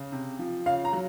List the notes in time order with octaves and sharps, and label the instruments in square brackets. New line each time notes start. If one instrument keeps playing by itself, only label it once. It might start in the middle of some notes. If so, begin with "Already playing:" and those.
Already playing: [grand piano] C#3
C3
F3
C#3 F5
A#5
F#3